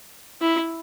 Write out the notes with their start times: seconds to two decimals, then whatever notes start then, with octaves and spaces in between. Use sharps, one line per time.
0.42 E4